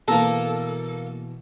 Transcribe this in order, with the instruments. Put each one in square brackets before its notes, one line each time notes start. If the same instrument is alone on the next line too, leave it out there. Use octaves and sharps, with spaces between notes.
[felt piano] B2 E3 [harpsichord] A#3 A#5 [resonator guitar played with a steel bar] A4